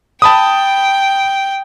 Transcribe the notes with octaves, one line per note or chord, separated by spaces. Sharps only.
G5 A5 B5 D#6